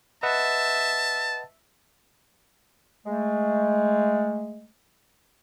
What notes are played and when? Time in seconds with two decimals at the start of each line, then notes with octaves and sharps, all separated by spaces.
0.23 B4 D#5 E5 F#5 A5
3.06 G#3 A3